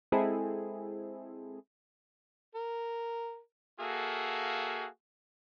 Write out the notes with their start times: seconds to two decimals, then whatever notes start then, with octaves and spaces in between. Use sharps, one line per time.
0.12 G#3 C4 E4 G#4 A4
2.55 A#4
3.80 A#3 F#4 G#4 A4 E5 F5